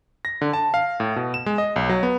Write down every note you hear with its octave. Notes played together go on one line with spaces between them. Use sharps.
A#6
D3
A5
F5
A2
B2
E7
G#3
D#5
B1
F#3
B3